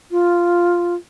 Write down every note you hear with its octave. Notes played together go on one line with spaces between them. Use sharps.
F4